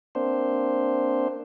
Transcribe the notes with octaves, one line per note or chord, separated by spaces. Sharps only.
A#3 C4 D4 C5